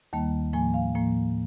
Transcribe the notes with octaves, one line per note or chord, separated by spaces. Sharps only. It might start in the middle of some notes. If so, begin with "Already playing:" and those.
D#2 D#3 G3 A#3 A5
A2 F3 A#3 G#5
F5
A2 F3 A#3